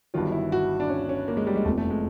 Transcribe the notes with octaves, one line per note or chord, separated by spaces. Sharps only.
G1 G2 D#3 F#3 F4
E4
F#4
D4
C#4
C#4
A#3
G#3
G3
G#3
F1 E2 C3 F3 A3
A3
G#3